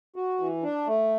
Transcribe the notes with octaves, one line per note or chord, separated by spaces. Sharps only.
F#4
E3
D4
A3